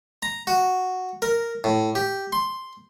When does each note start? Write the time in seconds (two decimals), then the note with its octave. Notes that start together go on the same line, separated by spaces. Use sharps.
0.23 A#5
0.47 F#4
1.22 A#4
1.64 A2
1.95 G4
2.32 C6